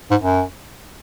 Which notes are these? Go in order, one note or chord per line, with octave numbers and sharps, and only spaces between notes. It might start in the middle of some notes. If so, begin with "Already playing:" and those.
G#2
F#2